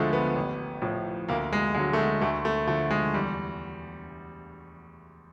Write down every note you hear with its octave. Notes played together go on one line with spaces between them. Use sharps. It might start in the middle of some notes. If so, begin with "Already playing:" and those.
Already playing: D2 D3 F3 G#3 A3
B3
A1
A2 F3
D2 A#3
G#3
D3 F#3 G#3
A3
G#3
D2 A3
A3
D3 F3 A3
G#3
E2 G3